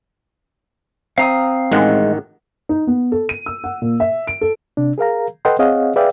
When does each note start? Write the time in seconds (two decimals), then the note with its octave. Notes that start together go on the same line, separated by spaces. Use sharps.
1.18 C4 F5 A#5 D#6
1.72 A1 D#3 G#3 F#5
2.69 D#4
2.87 B3
3.12 A4
3.29 D#7
3.46 E6
3.64 F#5
3.82 A#2
4.00 E5
4.27 D7
4.41 A4
4.77 C3 D4
4.98 G#4 A#4 F5 A#5
5.45 A4 B4 D#5 F#5 G5 C6
5.59 C4 G#4 C#5 D#5 F5 F#5
5.96 G#4 B4 D5 E5 F5 G5